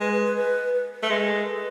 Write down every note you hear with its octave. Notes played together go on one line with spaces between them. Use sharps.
G#3 B4
B4
B4
B4
B4
B4
A3
G#3 A4
B4
A4
B4